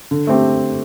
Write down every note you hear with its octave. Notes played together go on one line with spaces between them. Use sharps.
D3
A3 C4 G4